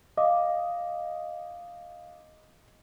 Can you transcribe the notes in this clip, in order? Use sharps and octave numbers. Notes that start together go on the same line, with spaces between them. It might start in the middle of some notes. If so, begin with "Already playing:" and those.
D#5 F5 D6